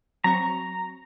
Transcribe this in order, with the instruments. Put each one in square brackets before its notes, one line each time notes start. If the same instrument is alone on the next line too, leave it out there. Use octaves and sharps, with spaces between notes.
[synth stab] F#3 C4 C#6 [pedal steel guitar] A#5